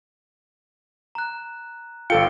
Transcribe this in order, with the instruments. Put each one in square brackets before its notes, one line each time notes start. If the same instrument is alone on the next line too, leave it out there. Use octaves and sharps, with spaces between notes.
[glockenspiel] A#5 F#6
[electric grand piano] G1 A4 C#7 [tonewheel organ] F4 F5 G5 [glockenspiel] G7